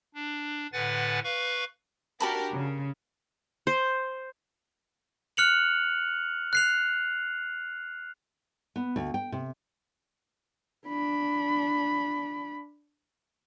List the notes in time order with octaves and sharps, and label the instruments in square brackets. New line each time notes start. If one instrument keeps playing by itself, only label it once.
[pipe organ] D4
A2 D3 B4 F#5 G#5 A6
B4 F5 C#6
[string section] D4 G4 A#4 [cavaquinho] F#4 A5 B5
[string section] C#3
[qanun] C5
[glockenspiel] F6 F#6 C#7 F7 F#7
F#6 C7 F7
[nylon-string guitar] B3
D2
G5
C3
[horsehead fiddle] D4 B5